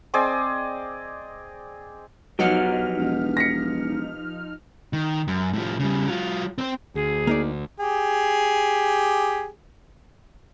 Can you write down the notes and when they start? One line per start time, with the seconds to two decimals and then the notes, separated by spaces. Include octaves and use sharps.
0.14 C4 G#4 D5 D#5
2.39 B1 F3 F#3 D#4 G4 B4 F#5 F6
2.97 E1
3.37 A#6 B6 C#7
4.93 D#3
5.28 F#2
5.53 A2 F3
5.79 C#3 G3
6.08 F#3 F4
6.58 C4 C5
6.95 D2 G#4
7.27 A#3 D#4 D5
7.80 G4 G#4